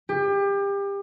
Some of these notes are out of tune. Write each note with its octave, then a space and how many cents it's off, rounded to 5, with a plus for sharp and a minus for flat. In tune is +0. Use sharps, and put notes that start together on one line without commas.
G4 +30